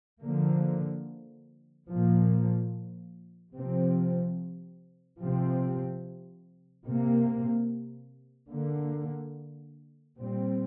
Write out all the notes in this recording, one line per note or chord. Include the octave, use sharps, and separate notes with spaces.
D3 F3 A#3
A#2 F3 A#3
C3 F3 C4
C3 F3 C4
C3 A#3
D3 A#3
A#2 G3 C4